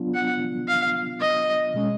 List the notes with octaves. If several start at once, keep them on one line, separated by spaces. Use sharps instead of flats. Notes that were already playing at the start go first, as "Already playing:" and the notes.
Already playing: F#3 B3 D4 F4
F#5
F5
D#5
B2 G#3 C#4